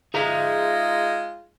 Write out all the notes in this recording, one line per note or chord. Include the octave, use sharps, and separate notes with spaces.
G#3 D#4 F4 G#4 E5 A#5